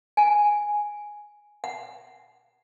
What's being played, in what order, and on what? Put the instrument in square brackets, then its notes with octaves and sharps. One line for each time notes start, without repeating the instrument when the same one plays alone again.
[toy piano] G#5
F#5